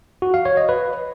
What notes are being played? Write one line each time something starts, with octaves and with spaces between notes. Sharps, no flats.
F#4
F5
C#5
D#5
B4